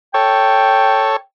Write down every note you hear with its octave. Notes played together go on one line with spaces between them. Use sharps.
A4 C#5 G5